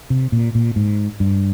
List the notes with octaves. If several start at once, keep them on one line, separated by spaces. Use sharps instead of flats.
C3
A#2
A#2
G#2
G2